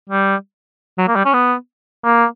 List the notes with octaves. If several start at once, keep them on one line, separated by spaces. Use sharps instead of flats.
G3
F#3
A#3
G3
C#4
B3
A#3